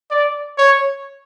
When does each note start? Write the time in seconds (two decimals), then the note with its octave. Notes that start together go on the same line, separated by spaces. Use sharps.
0.11 D5
0.58 C#5